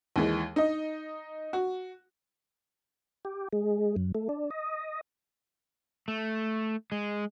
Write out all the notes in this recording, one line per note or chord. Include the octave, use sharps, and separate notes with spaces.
D#2 E3 G#3
D#4 D#5
F#4
G4
G#3
F#2
A3
D4
D#5
A3
G#3